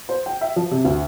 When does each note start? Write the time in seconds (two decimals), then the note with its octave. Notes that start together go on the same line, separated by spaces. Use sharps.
0.09 C5
0.26 G5
0.41 E5
0.56 F3
0.71 C3
0.85 D2